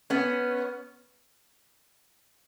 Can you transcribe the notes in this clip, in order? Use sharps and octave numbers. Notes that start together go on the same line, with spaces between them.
B3 C#4